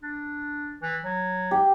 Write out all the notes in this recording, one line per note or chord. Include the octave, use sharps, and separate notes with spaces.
D4
E3
F#3
G4